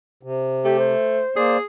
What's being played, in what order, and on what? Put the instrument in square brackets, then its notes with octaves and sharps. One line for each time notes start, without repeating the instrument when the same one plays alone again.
[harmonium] C3
[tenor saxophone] A3 [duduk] G4
[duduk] C5
[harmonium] A#3 C5 D5 [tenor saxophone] G#4